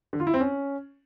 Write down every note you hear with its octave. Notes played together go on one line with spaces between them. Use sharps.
D3
F4
E4
C4
C#4